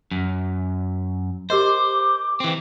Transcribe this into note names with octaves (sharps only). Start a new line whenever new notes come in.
F#2
G4 A#4 C5 D#5 D6
E3 C4